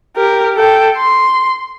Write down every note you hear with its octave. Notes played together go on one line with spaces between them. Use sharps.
G4 A#4
A4 G5
C6